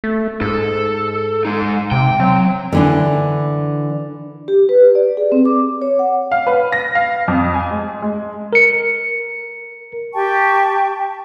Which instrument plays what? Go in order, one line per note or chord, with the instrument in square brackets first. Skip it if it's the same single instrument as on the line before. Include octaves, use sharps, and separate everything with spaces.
[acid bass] A3
[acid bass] G#2 [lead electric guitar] A4
[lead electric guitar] G#3 D#4
[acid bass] C3 [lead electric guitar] G5
[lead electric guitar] F#3 [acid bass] C4
[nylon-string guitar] D3 E3 D4
[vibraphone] G4
B4
D5
G#4
C4
D6
C#5
F#5
[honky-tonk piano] F5
B4
A#6
F5
F2
G#5
G#3
G#3
[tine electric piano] A#4 C#7
[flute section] G4 G5 A5 C#6